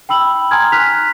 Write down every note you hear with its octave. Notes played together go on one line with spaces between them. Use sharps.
G5 B5 E6 F#7
G#5 A#5 C6 D#6 F6 G#6
F6 F#6 B6 F7